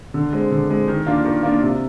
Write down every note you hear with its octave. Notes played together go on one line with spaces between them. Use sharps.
D3
G#3 C4
D3
G#3 C4
D#3
A#3 D4 F4
D#3
A#3 D4 F4
C3